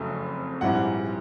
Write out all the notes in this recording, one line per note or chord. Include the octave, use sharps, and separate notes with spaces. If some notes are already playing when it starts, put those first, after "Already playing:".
Already playing: F#1 F2 C#3 F#3 A3
A#1 G#2 E3 G3 F#5